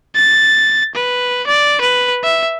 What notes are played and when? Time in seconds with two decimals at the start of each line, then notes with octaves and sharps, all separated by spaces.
0.16 A6
0.95 B4
1.47 D5
1.81 B4
2.24 E5